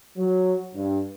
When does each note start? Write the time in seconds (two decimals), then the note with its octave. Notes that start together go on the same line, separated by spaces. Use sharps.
0.17 F#3
0.74 G2